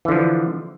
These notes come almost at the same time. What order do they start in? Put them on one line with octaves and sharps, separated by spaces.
E3 D3 F3